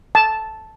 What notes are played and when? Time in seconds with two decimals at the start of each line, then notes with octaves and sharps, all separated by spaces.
0.15 A5